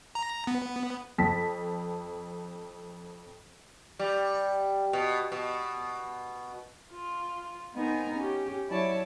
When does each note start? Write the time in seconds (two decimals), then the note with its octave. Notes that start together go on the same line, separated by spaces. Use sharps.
0.15 A#5
0.47 B3
1.18 F2 A5 B6
3.99 G3
4.93 B2
5.32 B2
6.92 F4
7.75 B3 C4 D#4 A#4 G#5 A#5
8.15 C#4 G4
8.68 F#3 E4 C#5 D5 A5